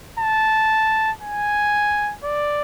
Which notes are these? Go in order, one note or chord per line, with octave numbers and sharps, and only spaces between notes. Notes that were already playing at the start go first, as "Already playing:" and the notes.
A5
G#5
D5